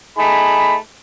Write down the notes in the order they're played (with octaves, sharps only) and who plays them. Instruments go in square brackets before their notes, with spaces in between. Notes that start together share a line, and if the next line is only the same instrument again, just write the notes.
[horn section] A3 D#4 G#4 B5